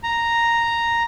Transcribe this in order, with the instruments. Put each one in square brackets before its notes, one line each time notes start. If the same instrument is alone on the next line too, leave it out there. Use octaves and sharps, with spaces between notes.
[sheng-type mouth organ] A#5